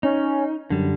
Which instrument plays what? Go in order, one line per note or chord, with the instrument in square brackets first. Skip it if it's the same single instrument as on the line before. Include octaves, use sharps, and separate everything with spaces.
[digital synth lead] C#4 [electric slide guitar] D#4
[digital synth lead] F#2 [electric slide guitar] D3 G3